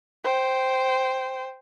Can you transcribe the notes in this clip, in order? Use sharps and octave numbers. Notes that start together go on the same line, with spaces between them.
C5 G5